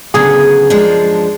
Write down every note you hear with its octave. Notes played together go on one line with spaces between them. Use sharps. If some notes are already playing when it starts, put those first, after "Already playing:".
D2 C#3 F#3 B3 G#4
F#2 F3 G#3 D4